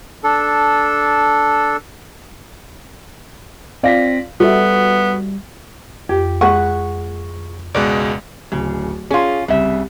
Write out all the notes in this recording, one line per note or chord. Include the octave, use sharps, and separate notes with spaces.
D4 A4
C4 F4 D5 F5 A#6 B6
G3 B3 F#4 A4 E5
F2 G4
G#3 B4 F#5 C#6
C#2 B2 G#3 B4 D5
D1 C#3
C#4 F4 G#4
C2 C#3 E5